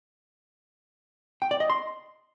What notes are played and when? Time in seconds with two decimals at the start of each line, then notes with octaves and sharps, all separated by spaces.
1.42 G5
1.51 D5
1.60 D#5
1.70 C6